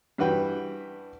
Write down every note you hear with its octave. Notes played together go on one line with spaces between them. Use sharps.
G2 E3 F#4 B4 G5